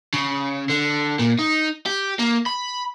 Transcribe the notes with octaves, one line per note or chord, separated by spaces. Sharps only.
C#3
D3
A#2
D#4
G4
A#3
B5